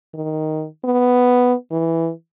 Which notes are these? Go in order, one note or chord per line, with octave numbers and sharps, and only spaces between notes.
D#3
B3
E3